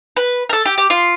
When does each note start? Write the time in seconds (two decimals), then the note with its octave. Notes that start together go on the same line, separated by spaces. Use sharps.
0.17 B4
0.49 A#4
0.53 A4
0.66 G4
0.78 G4
0.90 F4